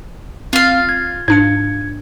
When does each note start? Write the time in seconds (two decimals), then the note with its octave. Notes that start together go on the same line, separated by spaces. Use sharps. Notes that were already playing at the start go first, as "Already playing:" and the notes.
0.53 C4 F4 F5
0.89 G#6
1.28 G#2 D4 G#6 C#7